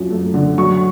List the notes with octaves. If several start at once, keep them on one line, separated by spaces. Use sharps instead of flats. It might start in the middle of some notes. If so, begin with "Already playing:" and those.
Already playing: F#2 F3
A3
D3
F#3 C#6